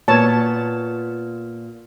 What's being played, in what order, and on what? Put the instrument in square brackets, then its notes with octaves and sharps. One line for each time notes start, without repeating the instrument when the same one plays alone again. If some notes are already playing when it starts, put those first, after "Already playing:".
[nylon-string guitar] A#2 B3 [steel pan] C#5 A5